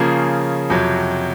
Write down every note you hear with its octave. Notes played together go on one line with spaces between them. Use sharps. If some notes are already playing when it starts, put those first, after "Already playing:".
Already playing: C#3 F3 A#3 C#4 G#4
F2 C3 F#3